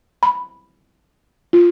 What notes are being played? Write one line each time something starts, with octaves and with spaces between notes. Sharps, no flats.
B5
F4